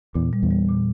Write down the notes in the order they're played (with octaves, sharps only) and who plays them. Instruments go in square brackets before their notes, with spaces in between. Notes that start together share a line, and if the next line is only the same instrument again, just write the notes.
[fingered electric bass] E2 [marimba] A#2
[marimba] G3
[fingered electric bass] E2
[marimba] G3
A#2